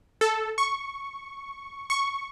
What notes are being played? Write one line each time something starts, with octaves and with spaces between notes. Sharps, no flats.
A4
C#6
C#6